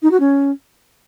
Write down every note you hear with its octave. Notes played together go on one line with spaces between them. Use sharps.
D#4
F#4
C#4